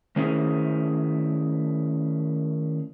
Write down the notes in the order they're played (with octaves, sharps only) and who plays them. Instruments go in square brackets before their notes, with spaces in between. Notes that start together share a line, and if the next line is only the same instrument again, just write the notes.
[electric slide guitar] D#3 A3 C#4 E4 G#4 C5